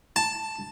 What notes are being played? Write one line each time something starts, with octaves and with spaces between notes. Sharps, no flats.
A5